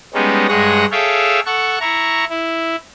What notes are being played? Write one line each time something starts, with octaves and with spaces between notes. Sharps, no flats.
G3 G#3 B3 C#4 D#4
G2 G#3 G#4 C#5 F#5 A#6
G#4 A4 C#5 E5 F5 G5
A4 F#5 C#6
E4 A#5 C#6
E4